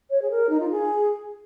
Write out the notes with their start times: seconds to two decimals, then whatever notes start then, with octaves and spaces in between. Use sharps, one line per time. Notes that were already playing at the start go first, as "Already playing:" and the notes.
0.10 C#5
0.22 G#4
0.31 A#4
0.49 D#4
0.60 F4
0.71 G#4